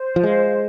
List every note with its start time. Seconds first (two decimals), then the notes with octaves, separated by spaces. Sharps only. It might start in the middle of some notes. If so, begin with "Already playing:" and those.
Already playing: C5
0.16 F3
0.23 G#3 F5